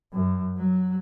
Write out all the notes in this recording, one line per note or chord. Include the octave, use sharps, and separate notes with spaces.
F#2
F#3